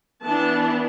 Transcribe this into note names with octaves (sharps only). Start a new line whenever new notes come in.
E3 B3 D4 A5